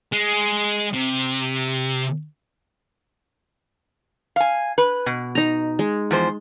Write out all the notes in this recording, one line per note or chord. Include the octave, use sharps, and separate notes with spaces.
G#3
C3
F5 G#5
B4
B2
D#4 A#5
G#3
E2 F3 C5